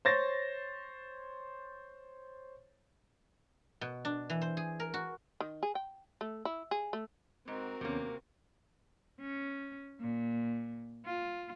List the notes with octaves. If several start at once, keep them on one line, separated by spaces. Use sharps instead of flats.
C5 C#5 A6 A#6
B2
D4
E3
C5
G#4
A#4
F#4
D#3
G#4
G5
A3
E4
G#4
A3
G#2 C4 F#4 A#4
D#2 C3 A#3 B3 C#4
C#4
A#2
F4